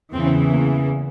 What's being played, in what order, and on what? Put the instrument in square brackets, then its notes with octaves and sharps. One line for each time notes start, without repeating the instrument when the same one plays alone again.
[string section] E2 C#3 E3 C4
A#3